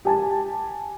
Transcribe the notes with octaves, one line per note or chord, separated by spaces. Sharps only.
G4 G#5 A5